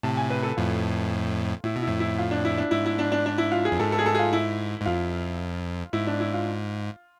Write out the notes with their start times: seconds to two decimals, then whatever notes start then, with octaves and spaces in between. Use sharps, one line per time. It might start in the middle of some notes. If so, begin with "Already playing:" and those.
0.03 A2 C3 A5
0.17 G#5
0.30 B4
0.43 A4
0.57 F2 A2 F4
1.64 A2 E4
1.76 B2
1.82 F2 A2 E4
2.00 E4
2.19 F4
2.31 D4
2.45 E4
2.58 D4
2.71 G#2 E4
2.86 E4
2.99 D4
3.12 D4
3.26 D4
3.38 E4
3.52 F4
3.65 G#4
3.72 F2
3.79 G#2 A4
3.92 A4
3.99 G#4
4.06 A4
4.15 G#4
4.19 F4
4.33 E4
4.81 G#2
4.86 F2 F4
5.93 G#2 E4
6.07 D4
6.20 E4
6.34 F4